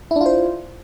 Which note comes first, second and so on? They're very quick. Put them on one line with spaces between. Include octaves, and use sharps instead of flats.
E4 D4 F4 C5